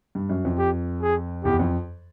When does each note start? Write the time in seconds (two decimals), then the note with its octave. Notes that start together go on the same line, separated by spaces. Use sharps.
0.15 G2
0.29 F#2
0.45 F2
0.58 G4
1.02 G#4
1.44 E2 G4
1.59 F2